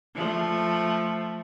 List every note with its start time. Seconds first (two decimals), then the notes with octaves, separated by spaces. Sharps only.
0.15 F3 A3